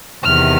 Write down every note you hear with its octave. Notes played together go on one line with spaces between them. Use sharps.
E2 C3 D#3 F6